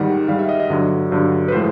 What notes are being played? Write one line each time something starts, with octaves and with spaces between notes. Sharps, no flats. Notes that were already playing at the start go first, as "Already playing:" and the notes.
Already playing: G#2 D#3 G3 F#5
G#2 D#3 G3 F5
E5
D#5
D#5
G2 D3 F#3
G2 D3 F#3
B4
A2 F3 G#3 C5